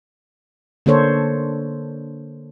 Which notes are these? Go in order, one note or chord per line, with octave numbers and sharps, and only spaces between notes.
D3 A#3 D4 A4 C5 C#5